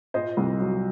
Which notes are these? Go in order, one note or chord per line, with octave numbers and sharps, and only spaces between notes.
A#2 C5 D#5
C2
F#3